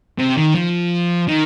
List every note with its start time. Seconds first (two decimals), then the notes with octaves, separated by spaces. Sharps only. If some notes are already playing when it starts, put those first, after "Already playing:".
0.19 C3
0.37 D#3
0.55 F3
1.28 D#3